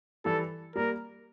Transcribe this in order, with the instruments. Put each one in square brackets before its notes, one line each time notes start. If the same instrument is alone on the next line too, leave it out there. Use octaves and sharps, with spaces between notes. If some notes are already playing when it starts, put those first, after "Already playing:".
[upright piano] E3 G3 [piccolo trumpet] A4
[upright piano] G3 A#3 [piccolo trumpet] A#4